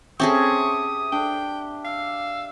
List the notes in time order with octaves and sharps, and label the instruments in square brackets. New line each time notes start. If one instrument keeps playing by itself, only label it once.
[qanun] C4 C#4 G#4 [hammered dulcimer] G4 E5 A5 [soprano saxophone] C#6 [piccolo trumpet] D#6
[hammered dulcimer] D4 [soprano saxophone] G5
[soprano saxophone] F5 [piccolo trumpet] E6